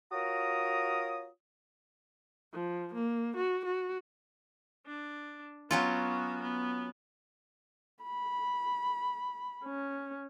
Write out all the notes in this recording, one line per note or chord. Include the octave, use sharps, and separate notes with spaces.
F4 F#4 A#4 C#5 A#5 D#6
F3
A#3
F#4
F#4
D4
F#3 B3 C#4 F4 F#4
B3
B5
C#4